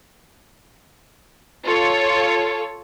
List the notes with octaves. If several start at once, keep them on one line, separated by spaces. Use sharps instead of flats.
F4 A4 C#5